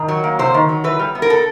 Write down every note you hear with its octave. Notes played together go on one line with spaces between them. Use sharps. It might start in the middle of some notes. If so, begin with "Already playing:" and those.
Already playing: D#3
F#3
A#3
C3 C5
D#3
F#3
E3 B4
G3
B3
A#4
A4